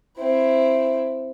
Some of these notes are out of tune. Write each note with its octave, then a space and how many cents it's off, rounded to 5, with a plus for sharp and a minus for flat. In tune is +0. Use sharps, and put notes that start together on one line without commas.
C4 +0 E4 +10